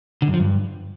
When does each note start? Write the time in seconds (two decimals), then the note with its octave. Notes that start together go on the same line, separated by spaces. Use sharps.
0.22 D3
0.28 F#2
0.34 F3
0.40 G2